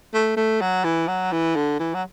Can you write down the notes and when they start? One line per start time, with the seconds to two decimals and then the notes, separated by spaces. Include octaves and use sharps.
0.14 A3
0.37 A3
0.61 F#3
0.84 E3
1.08 F#3
1.32 E3
1.56 D3
1.79 E3
1.94 F#3